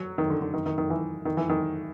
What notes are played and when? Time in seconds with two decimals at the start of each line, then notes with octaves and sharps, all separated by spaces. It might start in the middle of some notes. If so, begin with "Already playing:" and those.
Already playing: F#3
0.18 D#3
0.30 D3
0.42 D3
0.54 D#3
0.66 D#3
0.78 D#3
0.90 E3
1.25 D#3
1.37 E3
1.49 D#3